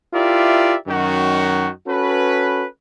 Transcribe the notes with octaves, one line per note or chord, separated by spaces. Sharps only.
E4 F4 G4 A#4 D5 E5
F#2 D#3 F#4
C#4 F#4 A4 B4